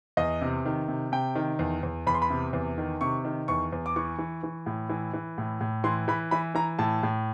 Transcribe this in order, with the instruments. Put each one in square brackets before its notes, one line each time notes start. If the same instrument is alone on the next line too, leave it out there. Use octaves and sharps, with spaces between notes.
[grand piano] E2 D#5
C3
D#3
C3
C3 G5
D#3
E2
E2
E2 B5
C6
B5
C3
E2
D#3
C3 C#6
D#3
E2 C#6
E2
D6
E3 C#6
E3
E3
A2
E3
E3
A2
A2
E3 C6
E3 B5
E3 B5
E3 A#5
A2 A5
A2